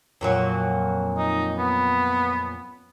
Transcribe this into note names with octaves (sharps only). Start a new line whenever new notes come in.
F2 A#2 F#3
D#4
B3